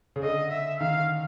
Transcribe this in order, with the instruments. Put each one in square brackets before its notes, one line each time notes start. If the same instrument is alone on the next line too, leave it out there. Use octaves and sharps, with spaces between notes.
[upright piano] C#3
[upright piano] D3 [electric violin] D#5
[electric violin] E5
[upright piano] D#3 [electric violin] F5